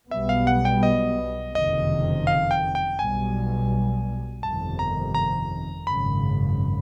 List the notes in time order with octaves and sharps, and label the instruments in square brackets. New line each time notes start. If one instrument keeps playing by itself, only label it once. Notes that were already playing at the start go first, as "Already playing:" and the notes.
[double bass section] B1 B2 G3 B3 [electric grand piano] E5
[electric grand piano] F5
F#5
G5
D#5
[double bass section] F#1 F2 C3 D#3 [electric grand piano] D#5
[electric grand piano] F5
G5
G5
[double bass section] B1 B2 G3 [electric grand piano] G#5
[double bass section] G1 F2 C3 D#3 [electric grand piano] A5
[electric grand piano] A#5
A#5
[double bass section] G#1 F#2 C#3 [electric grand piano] B5